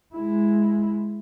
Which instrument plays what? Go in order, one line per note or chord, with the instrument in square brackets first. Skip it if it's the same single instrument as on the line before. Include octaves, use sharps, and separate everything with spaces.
[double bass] G#3 E4